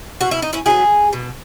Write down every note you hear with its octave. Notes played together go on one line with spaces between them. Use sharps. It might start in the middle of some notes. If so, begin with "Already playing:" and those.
B2 F#4
E4
D#4
C#4 E4
F#3 B3 E4 G#4
B2